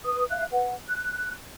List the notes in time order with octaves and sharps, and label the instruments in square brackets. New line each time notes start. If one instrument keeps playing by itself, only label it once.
[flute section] B4 D#6
E5 F5 F#6
B4 F#5
F#6